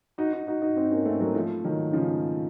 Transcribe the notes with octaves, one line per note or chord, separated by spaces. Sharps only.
D#4 F#4
D#4 F#4
D#4 F#4
D#4 F#4
C4 D#4
A#3 C#4
A3 C4
F#3 A#3
F3 A3
D#3 F#3
C#3 F3